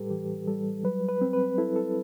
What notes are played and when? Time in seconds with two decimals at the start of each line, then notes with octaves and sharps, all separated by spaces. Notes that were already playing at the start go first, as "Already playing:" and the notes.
Already playing: A2 G3 G4 A4 B4
0.10 E3 G4
0.47 G3 A4
0.84 F#3 B4
1.08 B4
1.21 C4
1.33 B4
1.58 E4 A4
1.76 A4